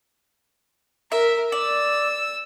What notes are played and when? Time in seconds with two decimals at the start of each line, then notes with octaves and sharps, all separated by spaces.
1.12 A#4 E5
1.52 D5 E6